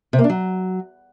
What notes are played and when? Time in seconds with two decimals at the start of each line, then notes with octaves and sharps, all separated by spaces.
0.13 C3
0.19 A#3
0.24 D4
0.30 F#3